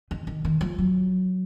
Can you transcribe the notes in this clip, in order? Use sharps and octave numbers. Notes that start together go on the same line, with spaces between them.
D#3
D#3
D#3
F3
F#3